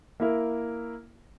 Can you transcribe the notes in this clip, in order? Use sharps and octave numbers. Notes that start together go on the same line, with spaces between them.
A#3 E4 A#4